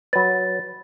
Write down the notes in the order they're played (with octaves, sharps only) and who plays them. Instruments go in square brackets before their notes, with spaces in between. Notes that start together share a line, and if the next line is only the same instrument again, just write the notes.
[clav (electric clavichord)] F#3 B4 [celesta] A6